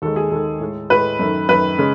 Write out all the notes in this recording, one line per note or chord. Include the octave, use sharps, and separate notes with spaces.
D#2 D#3 G#3 A4
G#4
D#2 D#3 G#3 A4
A2 G#3
A2 G#3 B4
F#2 D#3 A3
F#2 D#3 A3 B4
C#3 G#3